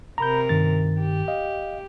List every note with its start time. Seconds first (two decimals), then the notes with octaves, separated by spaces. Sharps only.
0.18 C3 A#4 A#5 B5 G6
0.49 G2 D#3 A6
0.98 G4
1.28 D#5 F5